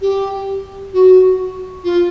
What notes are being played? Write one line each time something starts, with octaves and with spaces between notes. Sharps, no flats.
G4
F#4
F4